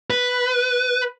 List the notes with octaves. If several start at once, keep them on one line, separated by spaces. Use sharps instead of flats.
B4